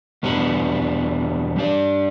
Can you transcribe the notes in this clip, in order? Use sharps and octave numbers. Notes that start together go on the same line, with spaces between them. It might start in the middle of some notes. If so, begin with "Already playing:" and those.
E2 B2 G3 B3 D4
G3 D4 G4 D5